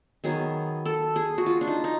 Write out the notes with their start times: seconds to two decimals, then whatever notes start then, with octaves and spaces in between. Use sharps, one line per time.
0.24 D#3 F#3 B3 G#4
0.86 A4
1.16 G#4
1.38 F#4
1.46 F4
1.61 D4
1.67 D#4
1.84 D#4